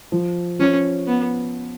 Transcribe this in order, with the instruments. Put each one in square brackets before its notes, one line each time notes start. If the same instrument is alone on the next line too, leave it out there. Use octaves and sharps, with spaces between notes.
[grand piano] F3
[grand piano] F3 [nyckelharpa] C#4
[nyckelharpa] B3